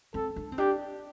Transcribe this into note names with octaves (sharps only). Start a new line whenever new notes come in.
C4 A4
D4
C4
D4 G4